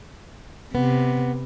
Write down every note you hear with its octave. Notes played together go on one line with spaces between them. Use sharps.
C3 B3